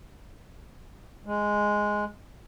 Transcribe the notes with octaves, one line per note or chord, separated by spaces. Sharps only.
G#3